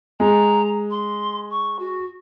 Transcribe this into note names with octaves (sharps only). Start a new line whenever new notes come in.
G#3 A#5
C6
C#6
F#4